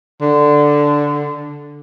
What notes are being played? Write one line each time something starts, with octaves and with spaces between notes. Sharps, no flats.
D3